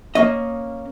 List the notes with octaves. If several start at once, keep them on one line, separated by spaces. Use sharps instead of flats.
A#3 C#4 D#5